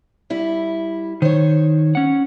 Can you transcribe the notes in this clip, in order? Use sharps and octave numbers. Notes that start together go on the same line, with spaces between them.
G3 E4
D#3 C5 C#5
C#4 F#5